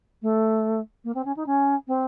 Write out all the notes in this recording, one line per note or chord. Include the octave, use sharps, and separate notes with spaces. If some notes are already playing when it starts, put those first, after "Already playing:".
A3
A#3
C4
C#4
D#4
C#4
C4